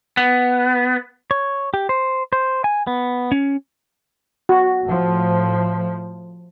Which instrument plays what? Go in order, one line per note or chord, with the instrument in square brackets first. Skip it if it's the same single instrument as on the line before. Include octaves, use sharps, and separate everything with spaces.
[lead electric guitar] B3
[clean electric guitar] C#5
G4
C5
C5
G#5
B3
C#4
[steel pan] F#4
[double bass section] A2 F3